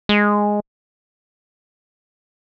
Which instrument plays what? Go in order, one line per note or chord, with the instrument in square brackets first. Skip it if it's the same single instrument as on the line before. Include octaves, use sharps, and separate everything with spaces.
[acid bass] G#3